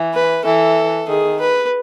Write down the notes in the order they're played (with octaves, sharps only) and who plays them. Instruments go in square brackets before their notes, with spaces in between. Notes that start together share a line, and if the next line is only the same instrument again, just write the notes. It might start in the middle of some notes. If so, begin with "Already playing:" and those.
Already playing: [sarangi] E3
[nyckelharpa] B4
[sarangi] E3 [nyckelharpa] A4
[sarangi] D#3 [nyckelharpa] G#4
[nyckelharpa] B4